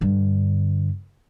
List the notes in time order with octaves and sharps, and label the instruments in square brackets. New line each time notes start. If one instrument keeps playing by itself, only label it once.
[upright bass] G2 D3